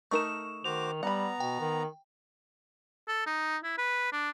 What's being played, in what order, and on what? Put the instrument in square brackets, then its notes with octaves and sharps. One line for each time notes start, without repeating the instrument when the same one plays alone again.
[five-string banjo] A3 D#4 A#4 [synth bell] C#6 E7
[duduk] D#3 [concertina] F#4 C5 D6 [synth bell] F7
[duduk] G3 [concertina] B3 A#5 [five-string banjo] F#5 B5
[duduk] B2 [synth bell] G5
[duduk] D#3
[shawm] A4
D#4
E4
B4
D4